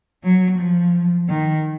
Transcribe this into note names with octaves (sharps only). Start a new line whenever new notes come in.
F#3
F3
D#3